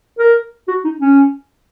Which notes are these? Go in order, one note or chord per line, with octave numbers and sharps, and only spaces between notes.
A#4
F#4
D#4
C#4